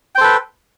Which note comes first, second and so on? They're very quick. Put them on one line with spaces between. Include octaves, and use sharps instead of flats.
G5 C5 A4 B4